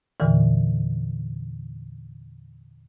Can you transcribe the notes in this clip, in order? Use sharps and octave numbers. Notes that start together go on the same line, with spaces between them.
E2 A#2 D3 E3